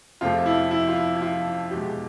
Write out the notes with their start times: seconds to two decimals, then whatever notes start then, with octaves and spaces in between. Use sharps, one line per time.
0.21 F2 C3 F3 A3 F4
0.46 E4
0.71 E4
0.89 F4
0.96 E4
1.17 E4
1.22 F4
1.71 E2 B2 G#3 G4